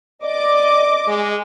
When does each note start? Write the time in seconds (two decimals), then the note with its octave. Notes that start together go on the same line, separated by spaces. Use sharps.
0.24 D5 D#5 D6
1.07 G#3